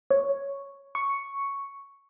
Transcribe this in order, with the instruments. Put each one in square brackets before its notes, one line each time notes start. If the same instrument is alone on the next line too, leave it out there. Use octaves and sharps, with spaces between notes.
[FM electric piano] C#5
C#6